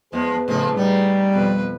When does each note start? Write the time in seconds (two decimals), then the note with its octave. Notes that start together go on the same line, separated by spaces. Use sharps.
0.13 E2 F3 G#3 G#4 B4
0.48 F2 A2 C#3 F3 D#4
0.77 C#3 G3 B3 D#4
1.33 F2 B2 B4